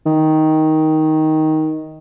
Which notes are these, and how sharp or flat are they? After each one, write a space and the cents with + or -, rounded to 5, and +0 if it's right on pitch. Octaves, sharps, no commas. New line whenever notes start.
D#3 +10